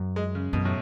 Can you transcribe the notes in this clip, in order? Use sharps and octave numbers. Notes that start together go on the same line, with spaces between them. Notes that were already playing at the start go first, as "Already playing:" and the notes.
Already playing: F#2
G#3
C#3
F#2 B2
A2